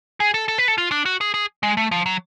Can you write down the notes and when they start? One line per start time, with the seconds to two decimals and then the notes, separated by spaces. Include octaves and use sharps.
0.20 G#4
0.34 A4
0.48 A4
0.58 B4
0.68 A4
0.78 F4
0.91 D4
1.06 F#4
1.21 G#4
1.34 G#4
1.63 G#3
1.77 A3
1.91 F3
2.06 F#3